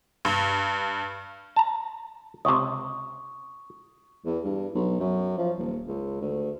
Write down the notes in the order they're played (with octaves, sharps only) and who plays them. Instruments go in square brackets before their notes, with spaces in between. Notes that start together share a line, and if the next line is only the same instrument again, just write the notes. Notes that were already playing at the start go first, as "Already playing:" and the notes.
[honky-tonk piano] G2
[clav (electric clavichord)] A5 A#5
[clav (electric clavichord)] C#2 C3 [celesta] C#6 D#6
[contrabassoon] E2
G2
B1
F#2
F3
D#1
C#2
D2